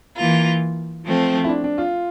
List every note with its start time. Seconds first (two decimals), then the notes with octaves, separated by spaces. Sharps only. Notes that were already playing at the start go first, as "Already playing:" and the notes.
0.16 E3 A#3 F4
1.05 F3 A3 C4
1.44 E4
1.49 D4
1.64 D4
1.78 F4